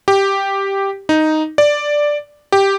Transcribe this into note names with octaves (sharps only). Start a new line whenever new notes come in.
G4
D#4
D5
G4